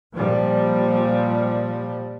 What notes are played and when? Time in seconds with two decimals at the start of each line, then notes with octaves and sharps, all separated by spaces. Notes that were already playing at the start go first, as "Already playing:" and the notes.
0.15 A#2 F3 G3